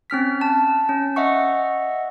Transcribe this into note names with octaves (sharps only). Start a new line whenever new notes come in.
C4 C#4 F6 B6
A5
C#4
D#5 E5 F#5 C#6